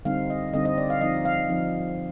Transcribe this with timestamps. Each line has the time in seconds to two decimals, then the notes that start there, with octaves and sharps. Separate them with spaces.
0.05 D3 G3 C4 D#4 F5
0.30 D#5
0.53 D3 G3 C4 D#4 D#5
0.65 D#5
0.78 D5
0.90 F5
1.01 F3 C4 D#4 D#5
1.25 F5
1.50 F3 C4 D#4